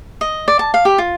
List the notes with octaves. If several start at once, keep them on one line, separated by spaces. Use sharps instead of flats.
D#5
D5
A5
F5
G4
F4